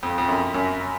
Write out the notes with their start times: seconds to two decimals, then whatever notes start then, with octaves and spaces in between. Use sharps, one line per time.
0.03 F2
0.18 F2
0.28 F#2
0.54 F#2